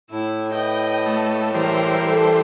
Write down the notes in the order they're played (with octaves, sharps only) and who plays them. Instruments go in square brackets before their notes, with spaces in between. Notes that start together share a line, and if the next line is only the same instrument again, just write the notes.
[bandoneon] A2 [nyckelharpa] E4
[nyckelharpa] B4 D#5 [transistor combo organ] G5
[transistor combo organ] A3
[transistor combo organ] E3 G3 C5 [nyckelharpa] A#4
[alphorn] A4